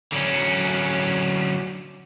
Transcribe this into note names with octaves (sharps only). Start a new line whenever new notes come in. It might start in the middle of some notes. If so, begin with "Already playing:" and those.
D3 F#3 C#4